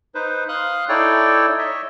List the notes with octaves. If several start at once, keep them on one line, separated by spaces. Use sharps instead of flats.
D#4 B4 C5
F5 C6 D#6 F#6
D#4 E4 A4 C#5 D5 G5
C#5 D#5 E5